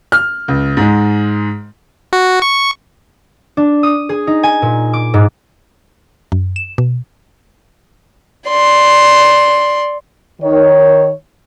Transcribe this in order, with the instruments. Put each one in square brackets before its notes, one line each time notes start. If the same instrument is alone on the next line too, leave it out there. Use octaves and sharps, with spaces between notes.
[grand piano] F6
C#2
G#2 G#3
[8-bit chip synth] F#4
C#6
[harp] D4
D#6
G#4
D#4
G#5
A#2
D6
G#2
[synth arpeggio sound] F#2
E7
B2
[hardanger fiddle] D5 C6
[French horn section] D#3 C#5